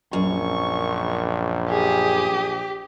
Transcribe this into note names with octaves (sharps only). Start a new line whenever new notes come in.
A#1 F#2 C#6
G4 G#4 D#6